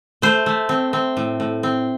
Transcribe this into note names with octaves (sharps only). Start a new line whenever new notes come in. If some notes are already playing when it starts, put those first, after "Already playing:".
A3 C5
A3
C4
C4
A2
A2
C4